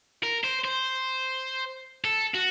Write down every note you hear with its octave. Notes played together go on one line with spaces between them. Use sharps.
A#4
C5
C5
A4
F#4